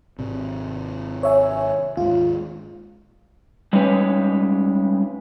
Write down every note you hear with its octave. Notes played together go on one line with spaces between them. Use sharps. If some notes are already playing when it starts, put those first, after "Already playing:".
G#1 C3
C#5 E5 G#5
D#2 G#2 F4
G3 G#3 C#4 D#4 B4 C#5